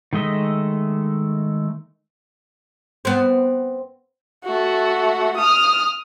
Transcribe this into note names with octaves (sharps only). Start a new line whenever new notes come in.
D#3 G#3 A3 D#5 E5
B3 C4
A3 F#4
D#6 F6